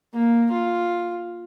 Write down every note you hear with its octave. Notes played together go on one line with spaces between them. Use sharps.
A#3
F4